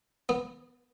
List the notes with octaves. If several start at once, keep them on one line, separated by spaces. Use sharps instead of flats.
B3